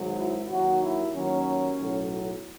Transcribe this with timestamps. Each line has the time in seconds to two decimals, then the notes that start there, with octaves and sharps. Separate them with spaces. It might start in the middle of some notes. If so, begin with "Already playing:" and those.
Already playing: G#1 G#2 D#3 F#3
0.18 E4
0.50 D#2 D#3 F#3 F#4
0.82 E4
1.14 D#2 D#3 F#3 C#4
1.80 B1 A2 F#3